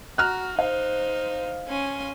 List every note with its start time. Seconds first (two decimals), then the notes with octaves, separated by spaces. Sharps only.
0.18 F#4 A#5 F6 F#6
0.59 D#4 C5 F5
1.67 C#4 G#5 C6